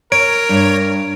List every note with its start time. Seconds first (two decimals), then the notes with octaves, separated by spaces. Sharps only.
0.12 A#4 C#5 D7
0.49 G2